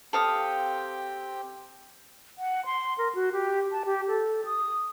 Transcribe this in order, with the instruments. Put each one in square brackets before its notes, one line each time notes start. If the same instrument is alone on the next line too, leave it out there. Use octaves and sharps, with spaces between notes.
[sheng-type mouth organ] C4 G4 G5 [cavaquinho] A4 F5 D#6
[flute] F#5
C6
A#4
F#4
G4
A5
G4
A4
D#6